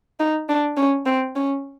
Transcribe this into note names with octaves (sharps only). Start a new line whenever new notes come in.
D#4
D4
C#4
C4
C#4